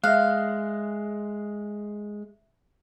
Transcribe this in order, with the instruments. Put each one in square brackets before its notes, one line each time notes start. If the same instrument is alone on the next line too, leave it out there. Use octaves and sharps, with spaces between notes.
[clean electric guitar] G#3 [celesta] E5 F#6 [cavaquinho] F5